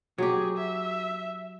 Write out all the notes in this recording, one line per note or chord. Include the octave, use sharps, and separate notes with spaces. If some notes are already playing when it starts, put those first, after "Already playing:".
F#3 G4 G#4
E5